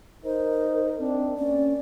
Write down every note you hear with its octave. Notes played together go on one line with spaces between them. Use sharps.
D#4 A#4 C5
C4 D4
A#3 C#4 D5